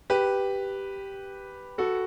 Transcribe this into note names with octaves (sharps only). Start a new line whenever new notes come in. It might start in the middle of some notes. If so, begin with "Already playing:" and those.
G4 B4
F#4 A4